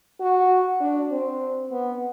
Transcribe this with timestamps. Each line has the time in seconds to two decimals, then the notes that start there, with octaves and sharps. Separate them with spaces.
0.20 F#4
0.81 D4
1.11 C4
1.71 B3